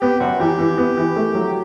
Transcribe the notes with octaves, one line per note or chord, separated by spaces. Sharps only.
B3 G4
F#2 F#4
E3 G4
E3
B3
E3
A3
F#3